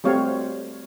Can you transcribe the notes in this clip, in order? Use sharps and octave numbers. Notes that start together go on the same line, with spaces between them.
G3 A3 C4 F#4 C#5 F5